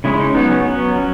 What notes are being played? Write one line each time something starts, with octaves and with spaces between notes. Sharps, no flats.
C#3 G#3 C#4 E4
D#4
F#3 B3 D#4
C#4
F#3 B3
F#3 C#4